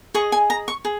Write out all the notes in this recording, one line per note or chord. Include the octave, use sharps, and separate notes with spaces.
G#4 D#5 C#6
G#5
A#5
C#6
G#4